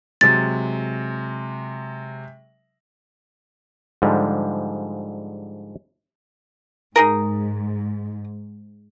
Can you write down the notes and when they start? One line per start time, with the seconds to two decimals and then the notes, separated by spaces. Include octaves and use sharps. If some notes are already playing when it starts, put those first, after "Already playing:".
0.21 C3 F#3 G#3 A6
4.02 G#2 D3 F3 G3 G#3
6.96 G#2 D#4 G#4 A#4